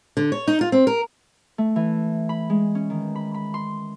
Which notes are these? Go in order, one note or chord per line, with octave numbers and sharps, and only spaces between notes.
D3
C#5
D#4
F4
C4
A#4
A3
E3
B5
G#3
C#4
D#3
B5
B5
C6